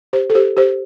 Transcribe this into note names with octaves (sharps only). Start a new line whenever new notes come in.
G4 C5
A4
G4 C5
G4 C5